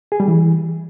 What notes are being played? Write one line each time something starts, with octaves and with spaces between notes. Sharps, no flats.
G#4
G3
E3